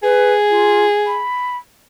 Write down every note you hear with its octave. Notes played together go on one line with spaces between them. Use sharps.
G#4 B4
F4
B5